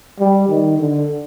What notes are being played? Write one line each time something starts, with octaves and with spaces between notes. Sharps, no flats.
G3
D#3
D3